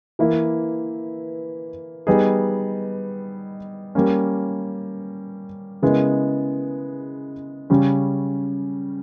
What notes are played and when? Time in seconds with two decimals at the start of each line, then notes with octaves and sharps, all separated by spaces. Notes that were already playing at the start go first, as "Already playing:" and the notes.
0.19 E3 A#3 E4
2.07 G3 B3 D#4 G#4
3.95 G3 A#3 C#4
5.82 C#3 G#3 B3 E4 A#4
7.70 C#3 G3 C#4